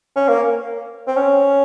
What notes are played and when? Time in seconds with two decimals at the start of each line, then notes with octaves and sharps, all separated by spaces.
0.16 C#4
0.29 A#3
1.07 C4
1.17 C#4